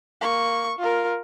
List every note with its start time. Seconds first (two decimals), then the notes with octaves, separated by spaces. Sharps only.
0.21 A#3 C#6
0.79 F4 A#4